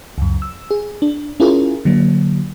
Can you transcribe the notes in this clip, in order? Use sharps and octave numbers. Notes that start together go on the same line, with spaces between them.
C#2 F#2
E6
G#4
D4
C#4 E4 F4 G#4 A#4
D3 F#3 A#3